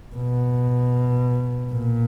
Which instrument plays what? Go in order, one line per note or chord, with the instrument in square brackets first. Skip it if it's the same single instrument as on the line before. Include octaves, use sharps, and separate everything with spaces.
[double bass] B2
A#2